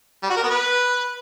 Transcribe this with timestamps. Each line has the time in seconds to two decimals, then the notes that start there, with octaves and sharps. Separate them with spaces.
0.23 G3
0.30 F#4
0.36 A#4
0.43 B3
0.50 B4